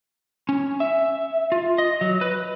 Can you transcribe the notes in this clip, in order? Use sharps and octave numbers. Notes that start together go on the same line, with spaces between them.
C#4
E5
F4
D#5
F#3
B4